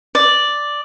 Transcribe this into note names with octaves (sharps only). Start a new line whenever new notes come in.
D5